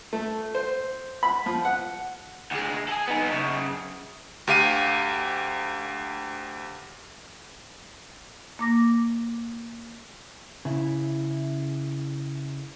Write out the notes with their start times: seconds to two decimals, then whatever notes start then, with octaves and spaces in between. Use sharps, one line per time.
0.13 A3
0.55 C5
1.23 B5
1.46 F3
1.65 F#5
2.51 D2 G#3
2.88 G#4 A4
3.08 B3 D#4
3.32 F#2 C#3
4.47 D2 G4 F5 D#7
8.59 A#3 D6 A#6
10.65 C#3 E4